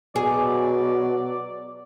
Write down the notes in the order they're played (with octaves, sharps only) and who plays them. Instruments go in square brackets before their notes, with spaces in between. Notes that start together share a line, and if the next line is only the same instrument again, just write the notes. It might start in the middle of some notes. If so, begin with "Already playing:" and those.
[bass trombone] B2 [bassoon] F#3 [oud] G#4 [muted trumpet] D5